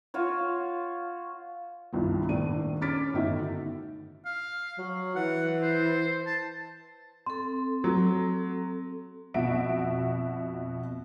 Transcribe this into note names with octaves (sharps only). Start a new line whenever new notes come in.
F4 F#4 C#5
C2 G2 D#3 F3
D#1 A2 D4 D#7
C#4 D6 F6 A6 B6 D7
G1 A2 D#3 D#4 F#4 E5
F5
F#3
E3 F#5
C5
A5
C4 A4 C6
F#3
F2 B2 F#4 E5 D7